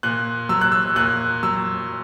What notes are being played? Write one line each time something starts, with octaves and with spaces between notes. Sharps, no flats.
A#2 F#6
F#3 E6
F#6
E6
A#2 F#6
F#3 E6